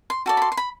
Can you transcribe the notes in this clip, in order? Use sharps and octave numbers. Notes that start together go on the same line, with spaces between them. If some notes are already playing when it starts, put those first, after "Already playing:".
C6
F#4 A4 D5
B5
C6
C6
B5